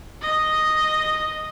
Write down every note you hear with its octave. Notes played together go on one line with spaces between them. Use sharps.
D#5